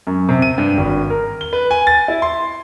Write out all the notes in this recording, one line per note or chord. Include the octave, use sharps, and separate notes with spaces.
F#2
C3
D#7
G2
G#1
A#4
G7
B4
G#5
A6
E4
C6